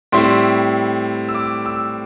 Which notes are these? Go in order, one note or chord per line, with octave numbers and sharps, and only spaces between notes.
A2 G3 C4 E4 C6
E6
D6
E6